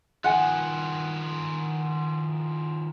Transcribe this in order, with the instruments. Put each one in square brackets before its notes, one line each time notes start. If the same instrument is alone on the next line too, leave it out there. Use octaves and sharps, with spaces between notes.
[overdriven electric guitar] D#3 F3 [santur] F#5 G#5